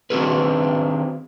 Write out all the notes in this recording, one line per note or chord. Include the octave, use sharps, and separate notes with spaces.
D#3 C4 D4 F#4 G#4 B4